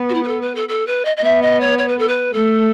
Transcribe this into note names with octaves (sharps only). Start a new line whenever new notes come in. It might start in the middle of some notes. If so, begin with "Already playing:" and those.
Already playing: B3
F#4
E4
B4
A4
B4
A4
A4
B4
D#5
D#5
B3 E5
D#5
C#5
C#5
B4
A4
B4
A3 A4